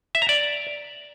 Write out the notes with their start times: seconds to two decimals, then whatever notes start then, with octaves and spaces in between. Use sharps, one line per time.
0.15 E5
0.22 A#5
0.29 D5